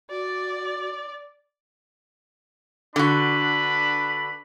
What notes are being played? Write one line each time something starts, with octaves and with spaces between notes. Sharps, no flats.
F#4 D5
D3 D4 F#4 B4 B5